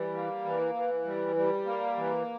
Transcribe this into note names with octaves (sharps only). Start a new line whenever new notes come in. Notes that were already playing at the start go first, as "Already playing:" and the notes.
Already playing: E3 G3
A#3
E3
E3
G3
G3
A#3
E3